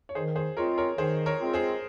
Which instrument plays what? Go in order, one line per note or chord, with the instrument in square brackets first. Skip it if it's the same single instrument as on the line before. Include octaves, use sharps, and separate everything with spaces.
[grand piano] C#5
[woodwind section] D#3 [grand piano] G#4 C5
[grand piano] G#4 C5
[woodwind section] G#3 C4 F4 [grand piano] A#4 C#5
[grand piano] A#4 C#5
[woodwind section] D#3 [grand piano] G#4 C5
[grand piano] A#4 C#5
[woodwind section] G#3 C4 F4
[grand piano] G#4 C5